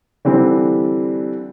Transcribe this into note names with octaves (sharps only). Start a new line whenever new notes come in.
D3 E3 G3 C4